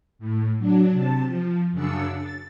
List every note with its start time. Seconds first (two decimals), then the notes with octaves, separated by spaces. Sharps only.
0.19 A2
0.59 F#3 D4
0.91 C3 A5
1.26 F3
1.72 F#2 C#3 D4 E6 C#7
2.15 A6